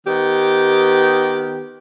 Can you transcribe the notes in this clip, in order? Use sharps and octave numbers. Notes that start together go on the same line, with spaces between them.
D#3 B3 G4